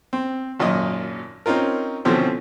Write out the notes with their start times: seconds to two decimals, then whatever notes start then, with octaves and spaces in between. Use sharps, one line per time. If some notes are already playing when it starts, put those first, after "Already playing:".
0.13 C4
0.59 G#1 F#2 A#2 D#5 D#6
1.46 C4 C#4 D#4 F4 A#4
2.05 B2 D3 E3 F3 C4 C#4